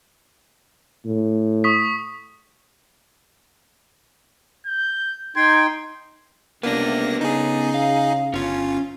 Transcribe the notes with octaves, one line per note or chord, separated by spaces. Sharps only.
A2
C#6 D#6 B6
G6
D#4 G5 C6 G#6
C#2 C3 A#3 B3 D4 A#6
C#3 D#4 G#4
F5
G1 C#4 F4